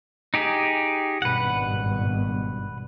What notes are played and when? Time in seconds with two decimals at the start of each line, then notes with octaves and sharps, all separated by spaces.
0.34 D#4 G4 G#4
1.22 G#1 G2 B2 B4 F#5